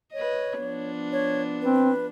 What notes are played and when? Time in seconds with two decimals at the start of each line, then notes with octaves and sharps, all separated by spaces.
0.13 B4 C#5 D#5
0.61 F3 B3 D4
1.12 C#5
1.61 C4 B4